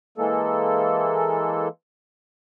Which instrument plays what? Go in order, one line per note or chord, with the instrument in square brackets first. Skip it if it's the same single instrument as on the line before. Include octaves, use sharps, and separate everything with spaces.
[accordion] E3 G#3 A#3 A4